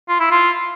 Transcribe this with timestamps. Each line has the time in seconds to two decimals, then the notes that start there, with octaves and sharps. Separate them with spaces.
0.09 F4
0.20 E4
0.31 F4